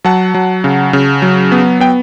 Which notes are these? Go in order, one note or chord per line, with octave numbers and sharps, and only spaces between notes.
F#3 F#5 A5
F#3
C#3
C#3
F#3
B3
B3 G5